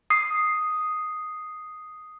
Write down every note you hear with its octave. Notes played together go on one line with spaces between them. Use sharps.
D#6 C7